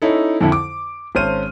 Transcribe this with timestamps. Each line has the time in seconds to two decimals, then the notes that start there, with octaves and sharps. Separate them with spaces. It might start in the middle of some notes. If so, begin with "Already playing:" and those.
0.02 C#4 D#4 E4 A4
0.41 F2 D3 E4
0.52 D6
1.15 G#1 C#4 C5 F6 D#7